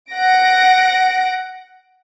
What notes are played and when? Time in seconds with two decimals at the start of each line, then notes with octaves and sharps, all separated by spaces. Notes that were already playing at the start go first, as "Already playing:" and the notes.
0.12 F#5 A#6 D7